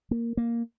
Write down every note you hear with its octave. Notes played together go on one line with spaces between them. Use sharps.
A#3
A#3